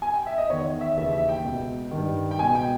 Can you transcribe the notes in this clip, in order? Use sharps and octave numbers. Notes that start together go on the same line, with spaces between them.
G#5
G5
E5
D#5
E2 D#3 C#5
E5
D#2 C#3 E3 E5
E5
G5
C#2 B2
G2 D#3
G5
C#2 B2 G#5
G5